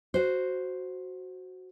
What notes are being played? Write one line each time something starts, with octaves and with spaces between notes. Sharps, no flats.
F#4 C5